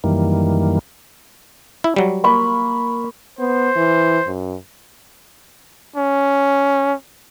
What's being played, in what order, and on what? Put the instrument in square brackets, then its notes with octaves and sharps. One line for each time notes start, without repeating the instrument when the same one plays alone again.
[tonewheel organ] F#2 D#3 E3 G3 A#3
[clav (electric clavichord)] E4
F#3 G3
[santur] A#3 B5 C#6
[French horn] B3 [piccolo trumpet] C5
[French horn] E3
F#2
[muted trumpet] C#4